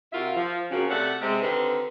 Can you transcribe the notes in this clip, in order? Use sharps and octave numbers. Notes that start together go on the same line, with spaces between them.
C3 F4 F#4 A#4 E5
F3
C#3 F3 A#3 C4 C#4 F#4
C3 A3 D5 F#5
C3 G#3
D3 D#3 C4 G4 B4